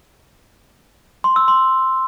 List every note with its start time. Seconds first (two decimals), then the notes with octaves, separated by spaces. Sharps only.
1.24 C6
1.36 E6
1.48 C6